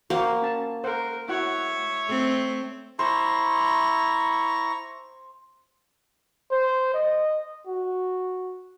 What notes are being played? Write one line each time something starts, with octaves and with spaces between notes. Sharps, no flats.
A#3 F#4 A#4 C5
C#4 A5
A#4 C5 F#5
E4 F#4 C#5 E5 F#5
A3 C4
E4 C5 A#5 C#6
C5
D#5
F#4